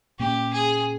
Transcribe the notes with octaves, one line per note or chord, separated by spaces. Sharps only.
A#2 A#3 C#4 G4
G#4